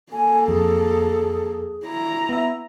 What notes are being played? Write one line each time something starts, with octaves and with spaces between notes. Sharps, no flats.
A#3 A4 G#5
F2 G#4
E4 A#5
B3 E5